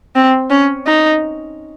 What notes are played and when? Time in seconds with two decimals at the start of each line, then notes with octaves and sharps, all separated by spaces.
0.16 C4
0.51 C#4
0.87 D#4